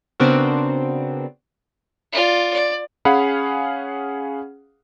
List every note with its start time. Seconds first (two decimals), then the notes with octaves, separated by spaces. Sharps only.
0.20 C#3 B3 C4 D4 F#4 A#4
2.13 F4 D5
2.53 D5
3.05 C#4 G#4 F5 F#5 B5